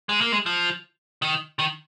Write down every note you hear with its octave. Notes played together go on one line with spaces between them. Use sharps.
G#3
A#3
G#3
F3
D#3
D#3